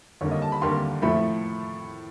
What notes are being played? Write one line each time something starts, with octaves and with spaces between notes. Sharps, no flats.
D#2 D3 G3 A#3 C#5
D#5
A5
B5
D#2 D3 G3 A#3 C6
A2 F3 A3 B5